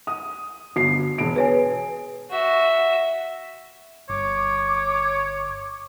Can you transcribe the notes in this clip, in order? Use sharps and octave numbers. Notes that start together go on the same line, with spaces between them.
D#6
G1 F#4 C7
E1 D7
G#4 B4 C#5 G#5
F#4 E5
G1 C#5 D6